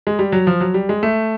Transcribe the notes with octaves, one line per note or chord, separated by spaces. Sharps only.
G#3
G3
F#3
F3
F#3
G3
G#3
A3